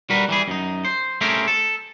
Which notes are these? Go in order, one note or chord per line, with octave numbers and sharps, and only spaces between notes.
G3 F#4 A#4 B4
E3 G3 G#4
F#2 D#4
C5
A3 C4 C#4 G4 G#4 A#4
A4